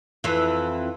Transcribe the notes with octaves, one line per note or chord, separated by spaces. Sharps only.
F2 E3